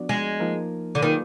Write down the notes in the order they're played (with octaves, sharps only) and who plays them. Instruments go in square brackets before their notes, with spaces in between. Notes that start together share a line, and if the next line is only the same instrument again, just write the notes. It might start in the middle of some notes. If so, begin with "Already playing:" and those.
Already playing: [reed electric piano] F3 B3 D4 F#4 D5
[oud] G#3
[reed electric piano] F3 A#3 D#4 A#4
[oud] D3
[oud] D#3 [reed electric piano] F#3 A#3 F4 G#4 B4